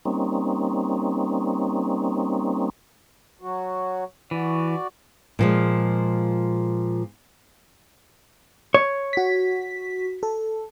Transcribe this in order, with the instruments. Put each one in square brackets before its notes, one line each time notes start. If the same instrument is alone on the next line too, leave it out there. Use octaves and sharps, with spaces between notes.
[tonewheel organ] G3 A#3 C4 C#4 D#4
[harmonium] F#3 F#4
[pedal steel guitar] E3 [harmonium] F#4 D5
[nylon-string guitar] A#2 F3 G#3
[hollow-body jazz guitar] C#5
[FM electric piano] F#4 B6
A4